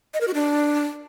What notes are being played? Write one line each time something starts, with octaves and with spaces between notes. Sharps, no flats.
D#5
A#4
F#4
D4